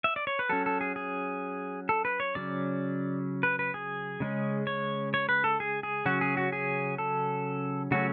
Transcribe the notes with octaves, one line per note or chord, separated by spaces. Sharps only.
E5
D5
C#5
B4
F#3 C#4 A4
A4
G#4
G#4
A4
B4
C#5
C#3 F#3 C#4 D5
B4
B4
G#4
C#3 G#3 C#4
C#5
C#5
B4
A4
G#4
G#4
C#3 F#3 C#4 F#4
G#4
F#4
G#4
A4
C#3 F#3 A3 C#4 F#4